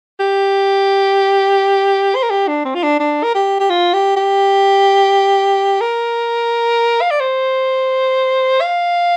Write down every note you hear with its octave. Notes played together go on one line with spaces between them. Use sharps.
G4
C5
A#4
G4
D4
C4
F4
D4
D4
A#4
G4
G4
F4
G4
G4
A#4
F5
D5
C5
F5